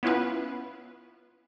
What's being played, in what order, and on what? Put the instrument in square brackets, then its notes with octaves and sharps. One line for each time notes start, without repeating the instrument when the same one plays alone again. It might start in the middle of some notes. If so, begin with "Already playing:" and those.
[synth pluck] B3 C#4 E4 F4 B4